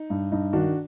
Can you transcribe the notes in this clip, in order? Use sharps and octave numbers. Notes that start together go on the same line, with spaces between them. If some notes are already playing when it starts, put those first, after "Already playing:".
Already playing: D#4
G2
G2 D#4
D#3 D4 F#4